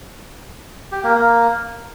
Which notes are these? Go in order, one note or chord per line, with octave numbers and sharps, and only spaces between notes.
G4
A#3
A#3